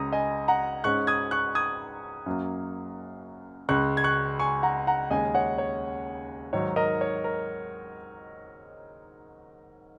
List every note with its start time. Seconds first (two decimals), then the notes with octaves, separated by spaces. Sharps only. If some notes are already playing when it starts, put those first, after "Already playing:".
Already playing: C#2 C#3 G#3 C#4 A#5 D#6
0.12 D#5 G#5
0.48 F#5 A#5
0.84 G#2 G#3 C#4 C#6 F#6
1.07 D#6 G#6
1.31 C#6 F#6
1.55 D#6 G#6
2.26 F#2 F#3 A#3
3.69 C#2 C#3 G#3 C#4 C#6 F#6
3.97 G#6
4.04 C#6 F#6
4.40 G#5 C#6
4.63 F#5 A#5
4.87 F#5 A#5
5.11 D#2 C#3 G#3 C#4 D#5 G#5
5.35 C#5 F#5
5.58 C#5
6.53 G#2 D#3 F#3 C#5
6.76 A#4 D#5
7.01 C#5
7.24 A#4